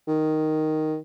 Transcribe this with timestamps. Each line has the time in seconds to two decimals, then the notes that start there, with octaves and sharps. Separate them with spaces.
0.08 D#3